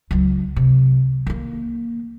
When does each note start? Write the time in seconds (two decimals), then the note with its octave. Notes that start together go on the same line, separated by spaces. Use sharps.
0.11 C#2 F#3
0.56 C3
1.27 D#3 A#3